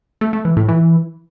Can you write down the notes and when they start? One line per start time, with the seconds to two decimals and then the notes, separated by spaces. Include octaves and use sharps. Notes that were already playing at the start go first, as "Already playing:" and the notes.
0.21 A3
0.33 A3
0.45 E3
0.57 A2
0.69 E3